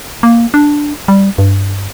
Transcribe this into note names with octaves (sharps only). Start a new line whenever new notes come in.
A#3
D4
G3
G2